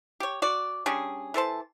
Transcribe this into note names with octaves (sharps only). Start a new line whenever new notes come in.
G4 C#5
F#4 D5
G3 C#4 D4 G#4
E3 A4 C5 A5